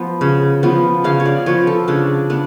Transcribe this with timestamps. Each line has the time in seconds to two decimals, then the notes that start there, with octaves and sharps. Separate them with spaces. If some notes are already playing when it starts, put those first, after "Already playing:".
Already playing: F3 B3
0.21 C#3
0.63 F3 B3
1.04 C#3 F5
1.20 C#5
1.25 D5
1.46 F3 B3 C#5
1.67 A4
1.88 C#3 D4
2.30 B3 D4